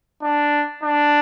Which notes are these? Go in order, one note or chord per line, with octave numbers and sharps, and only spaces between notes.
D4
D4